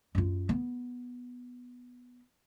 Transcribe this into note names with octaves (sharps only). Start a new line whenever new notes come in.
F#2 F4
B3